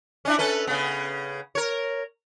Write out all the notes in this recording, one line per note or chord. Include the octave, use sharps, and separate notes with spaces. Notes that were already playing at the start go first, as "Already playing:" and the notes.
C#4 D4 E4
C#4 A4 B4
C#3 B3
A#4 C#5